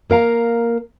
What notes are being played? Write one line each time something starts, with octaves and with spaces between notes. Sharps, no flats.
A#3 A#4 F5 A#5